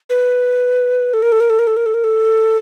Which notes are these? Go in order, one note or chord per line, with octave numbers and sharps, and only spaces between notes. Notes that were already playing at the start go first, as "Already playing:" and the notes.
B4
A4
A#4
A4
A#4
A4
A#4
A4
A#4
A4
A#4
A4